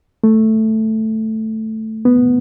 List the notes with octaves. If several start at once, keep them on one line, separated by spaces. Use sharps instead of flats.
A3
B3